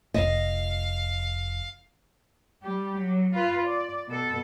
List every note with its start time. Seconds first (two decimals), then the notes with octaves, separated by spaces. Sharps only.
0.14 F1 F2 D#5 F5
2.63 G3 G4
2.98 F#3
3.34 F4 B4
3.66 D5
4.08 B2 A4